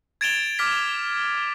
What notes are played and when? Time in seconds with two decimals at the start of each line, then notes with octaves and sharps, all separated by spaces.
0.21 G#6 A6 D7 E7 F7 G7
0.59 D6 F6 B6